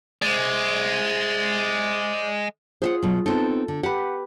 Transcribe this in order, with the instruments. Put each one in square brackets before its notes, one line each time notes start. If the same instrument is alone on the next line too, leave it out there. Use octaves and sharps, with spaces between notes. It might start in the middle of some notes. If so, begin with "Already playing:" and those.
[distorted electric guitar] G#3 [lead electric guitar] C5 D5
[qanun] F4 G#4 [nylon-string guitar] C5 E5 F#5
[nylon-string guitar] B2 F#3
[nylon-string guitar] B3 C4 D#4 [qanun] A4
[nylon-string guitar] D3
[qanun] G4 B4 [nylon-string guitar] F#5